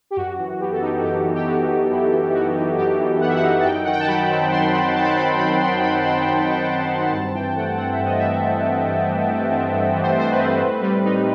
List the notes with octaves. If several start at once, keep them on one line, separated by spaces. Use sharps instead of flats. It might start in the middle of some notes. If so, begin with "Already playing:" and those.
G4
F#2 F#4
E3
B3 G4
A4
D#4 G4
F#4
F#2 G4
E3
G4
B3 F#4
D#4
F#2 E4
E3
B3 F#4
D#4
F#2 G4
E3
B3 F#5
E5
F#5
D#4
A5
F#2 G5
D#3 F#5
G5
A5
F#3 B5
C4
F#2 C6
D#3 B5
F#3 A5
B5
A5
C4 B5
F#2 B5
D#3 C6
F#3 B5
C4 C6
F#2 B5
D#3
F#3 G5
C4
G2 A5
E3 G5
A3 F#5
C4 F#5
E5
G2
D#5
E3 E5
A3
C4
G2
E3
A3
C4
G2
E3
C5
A3 C5
B4
C4
A2
G3
D#4